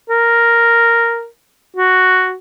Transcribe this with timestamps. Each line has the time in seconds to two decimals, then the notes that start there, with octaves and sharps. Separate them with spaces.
0.10 A#4
1.76 F#4